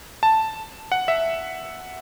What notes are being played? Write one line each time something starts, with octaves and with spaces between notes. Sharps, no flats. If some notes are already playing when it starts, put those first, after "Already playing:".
A5
F#5
E5